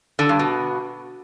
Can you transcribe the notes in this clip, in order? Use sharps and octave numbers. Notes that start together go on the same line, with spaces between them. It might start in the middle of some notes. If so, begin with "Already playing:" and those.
D3
G2
B2